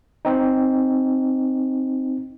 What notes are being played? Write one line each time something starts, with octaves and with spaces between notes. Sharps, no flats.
C4 D#4